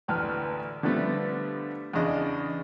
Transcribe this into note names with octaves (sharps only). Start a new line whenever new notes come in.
A1 D2 A2 B4 A5 F6
D3 F3 G3 A3 B3
E2 C#3 D4 D#5